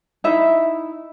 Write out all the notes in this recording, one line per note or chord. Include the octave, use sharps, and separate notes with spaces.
D#4 E4 E5